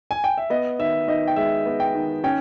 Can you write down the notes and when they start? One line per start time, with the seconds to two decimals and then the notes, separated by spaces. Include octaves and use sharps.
0.11 G#5
0.24 G5
0.38 E5
0.50 B3 D#5
0.79 D#3 E5
1.08 D#3 D#5
1.28 G5
1.36 G#3 E5
1.66 B3
1.80 G5
1.95 D#3
2.24 C#4 G5